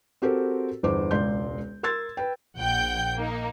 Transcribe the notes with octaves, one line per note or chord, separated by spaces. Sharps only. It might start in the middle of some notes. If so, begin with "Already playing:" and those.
C4 F#4 G4 A4 A#4 C5
G1 E2 C5 D6
E1 C#2 D5 C6 G6
A#4 C6 E6 G#6 A6
B4 G5
A#1 F#5 G5 G6
A#3 D#4